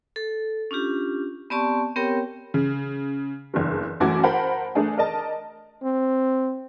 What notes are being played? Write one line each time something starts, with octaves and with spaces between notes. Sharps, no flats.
A4
C#4 D4 F4 G4
B3 C4 G4 D5 A5 C#6
B3 C4 G4 A#4 C#5 G5
C#3
F#1 E2 G2
A1 F#2 A3 F#4 D6 G#6
A#4 C5 F#5 A5 B5
A3 D4 G#4 A#4
A#4 D5 D#5 A5
C4